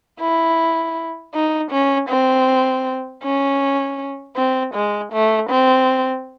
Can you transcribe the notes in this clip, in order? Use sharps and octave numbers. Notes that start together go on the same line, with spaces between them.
E4
D#4
C#4
C4
C#4
C4
G#3
A3
C4